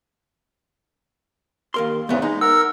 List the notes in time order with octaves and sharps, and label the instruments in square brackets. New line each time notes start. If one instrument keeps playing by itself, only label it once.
[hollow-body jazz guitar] D#2 A#4 C6
[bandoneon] E2 G#2 C#3 [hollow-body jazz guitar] A3 B3
[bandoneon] G#3 [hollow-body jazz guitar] D#4
[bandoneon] A#4 F#5 [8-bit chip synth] E6